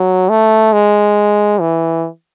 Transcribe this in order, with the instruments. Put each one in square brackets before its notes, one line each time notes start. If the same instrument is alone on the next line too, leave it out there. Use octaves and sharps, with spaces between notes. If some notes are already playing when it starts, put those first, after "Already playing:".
Already playing: [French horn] F#3
A3
G#3
E3